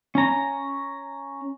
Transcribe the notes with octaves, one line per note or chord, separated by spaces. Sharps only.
C#4 A#5